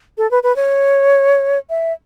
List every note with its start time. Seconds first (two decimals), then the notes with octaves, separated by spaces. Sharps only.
0.18 A4
0.31 B4
0.43 B4
0.56 C#5
1.70 E5